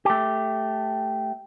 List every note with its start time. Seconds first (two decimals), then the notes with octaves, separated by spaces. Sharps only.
0.05 A3 G4